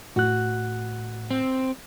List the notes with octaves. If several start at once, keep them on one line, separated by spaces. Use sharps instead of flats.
A2 F#4 F#6
C4